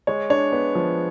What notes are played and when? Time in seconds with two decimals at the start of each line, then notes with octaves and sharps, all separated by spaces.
0.07 G#3 C#5
0.30 D4 C#5
0.52 B3
0.75 F3